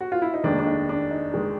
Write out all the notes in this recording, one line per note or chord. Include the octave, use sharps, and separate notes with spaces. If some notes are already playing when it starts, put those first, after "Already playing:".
F#4
F4
E4
D#4
F1 D#2 D#3 G#3 D4
D4
D#4
D4
D#4
D#3 G#3